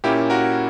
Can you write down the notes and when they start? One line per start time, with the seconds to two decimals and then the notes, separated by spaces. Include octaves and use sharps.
0.04 A#2 A#3 C#4 E4 G4
0.30 F#4 A#4